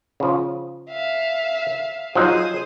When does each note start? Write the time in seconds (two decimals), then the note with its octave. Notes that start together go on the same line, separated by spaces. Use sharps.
0.20 C#3 F3
0.90 E5 F5
2.15 F3 F#3 D#4 G#4 C5 D#6